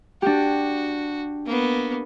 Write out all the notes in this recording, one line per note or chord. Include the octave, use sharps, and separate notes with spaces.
D4 F#4 G4
A#3 B3